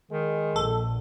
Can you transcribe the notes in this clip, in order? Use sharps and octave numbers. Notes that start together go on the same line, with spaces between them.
D#3 G#3
A#1 A#2 A4